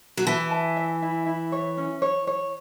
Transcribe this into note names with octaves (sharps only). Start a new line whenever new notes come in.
F#3
E3 A5
A5
E5
E4
E4
C#5
C#4
C#5
C#5